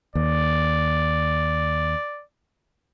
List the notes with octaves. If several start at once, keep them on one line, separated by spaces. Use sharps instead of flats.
D#2 D5